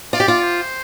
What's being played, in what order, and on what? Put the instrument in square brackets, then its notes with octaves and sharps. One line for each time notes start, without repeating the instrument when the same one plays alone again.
[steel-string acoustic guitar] F4 [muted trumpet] D5
[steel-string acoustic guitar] G4
F4
[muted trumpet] C5